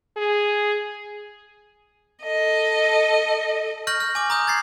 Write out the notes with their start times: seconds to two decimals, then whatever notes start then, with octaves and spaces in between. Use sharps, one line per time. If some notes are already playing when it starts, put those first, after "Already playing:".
0.17 G#4
2.24 A4 D#5
3.87 C#6 F6 G6 A#6 F#7
4.00 F6
4.15 G#5 D6
4.30 A#5 D#6 G6
4.47 G#6 A6 C7